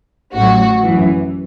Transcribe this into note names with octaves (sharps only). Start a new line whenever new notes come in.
A1 A2 F#3 F#4
F#2 E3